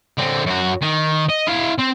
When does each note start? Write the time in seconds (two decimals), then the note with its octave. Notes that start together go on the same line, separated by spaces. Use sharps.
0.18 D3 C4
0.46 F#2 F#4
0.81 D#3
1.29 D#5
1.47 E4 F5
1.78 C4